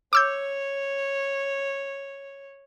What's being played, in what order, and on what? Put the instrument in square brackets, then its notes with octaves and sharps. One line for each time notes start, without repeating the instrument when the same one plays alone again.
[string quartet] C#5 [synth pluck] D6 E6 G6